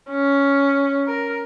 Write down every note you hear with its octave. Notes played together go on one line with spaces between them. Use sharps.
C#4
A#4